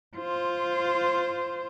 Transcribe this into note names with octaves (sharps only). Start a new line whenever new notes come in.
F4 C5